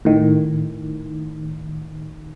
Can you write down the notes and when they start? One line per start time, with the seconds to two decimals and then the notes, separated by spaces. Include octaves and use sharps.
0.05 A2 D#3